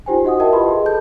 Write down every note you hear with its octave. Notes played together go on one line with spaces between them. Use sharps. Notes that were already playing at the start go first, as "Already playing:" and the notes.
D#4 F4 G4 C5 G5 G#5
F#4 D#5 F#5 D#6
E4 A#4 D#5 E5 G5 A5
F4 G4 B4 D#5 B5 C6
G#4 D#5
A4 A5 G6